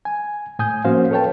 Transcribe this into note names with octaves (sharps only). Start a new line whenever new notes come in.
G#5
A2 G#5 D#6 G6
F3 A#3 C#4 F#4 C5 F5
A4 B4 C#5 G5 A5